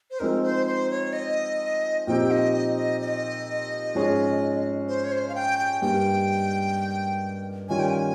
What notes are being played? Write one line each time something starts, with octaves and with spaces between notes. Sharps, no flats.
C5
F3 G#3 C4 D#4 A#4
C5
C5
C#5
D#5
A#2 F3 C4 D#4 G4 G5
D#5
D#5
D#5
D#5
G#2 F3 G#3 C#4 G#4
C5
C#5
C5
F5
G5
G5
G2 G3 A#3 G5
D#3 G3 C#4 F4 G#5
G5
G#5